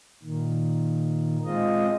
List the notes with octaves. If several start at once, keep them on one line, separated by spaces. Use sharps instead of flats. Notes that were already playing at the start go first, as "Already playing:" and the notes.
A#2 D#3
G#3 C4 F4 D#5